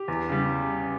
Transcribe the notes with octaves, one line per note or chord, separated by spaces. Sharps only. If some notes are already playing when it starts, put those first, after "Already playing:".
Already playing: G4
E2
C#3 G3